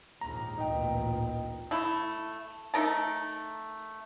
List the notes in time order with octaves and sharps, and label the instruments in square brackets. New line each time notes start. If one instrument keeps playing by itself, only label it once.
[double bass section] A#1 D#2 G#2 [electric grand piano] A#5
[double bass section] A1 D2 A#2 [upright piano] D#4 G5
[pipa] A3 E4
A3 D#4 A#4 A5